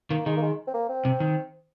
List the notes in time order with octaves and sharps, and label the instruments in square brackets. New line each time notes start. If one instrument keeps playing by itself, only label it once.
[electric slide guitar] D#3 [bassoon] A#3
[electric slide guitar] D#3 [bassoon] G#3
[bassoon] A#3
G#3
C4
A#3
C4
[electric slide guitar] C3
D#3